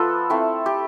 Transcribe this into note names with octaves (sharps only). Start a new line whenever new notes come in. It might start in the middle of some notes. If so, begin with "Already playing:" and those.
Already playing: F3 B3 F4 A4 B4
A3 C4 E4
G4